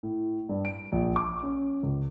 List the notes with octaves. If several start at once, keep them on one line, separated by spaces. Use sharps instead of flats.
A2
G2
D7
A#1
D6
C#4
C#2